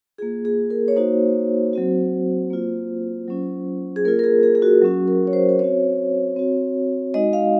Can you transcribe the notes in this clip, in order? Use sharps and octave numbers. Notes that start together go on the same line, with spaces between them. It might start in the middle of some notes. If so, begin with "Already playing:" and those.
A#3 F4 G#4
G#4
A#4
C#5
A#3 D#4 F#4 C5
F#3 C4 F#4
A#3 F4
F#3 C#4 F4
G#4
A#3 F4 A#4
A#4
G#4
G#4
G#4
F#4
F#3 C#4 F#4
A#4
C#5
C5
C5
C4 F#4 C#5
C4 F#4
G#3 D#4 F#4 D#5
F5